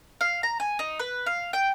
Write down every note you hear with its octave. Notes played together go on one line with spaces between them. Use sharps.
F5
A#5
G#5
D#4
B4
F5
G5